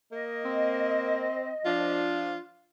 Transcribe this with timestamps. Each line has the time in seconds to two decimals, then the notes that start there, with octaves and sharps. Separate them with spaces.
0.12 A#3 D#5
0.44 C4
1.65 F3 D4 F4